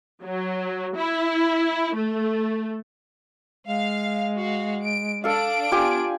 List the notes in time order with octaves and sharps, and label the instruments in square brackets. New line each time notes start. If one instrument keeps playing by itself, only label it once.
[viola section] F#3
E4
A3
[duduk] G#3 [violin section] F5
[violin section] F#4 F5
D7
[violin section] D4 D5 D7 [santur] A4 F5
[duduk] B3 [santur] F4 G4 G#5